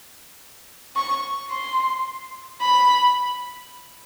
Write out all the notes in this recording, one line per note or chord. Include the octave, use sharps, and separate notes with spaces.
C#6
C6
B5